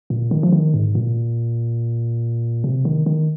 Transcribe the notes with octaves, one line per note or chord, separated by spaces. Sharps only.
A#2
D#3
F3
D#3
G#2
A#2
C3
D#3
D#3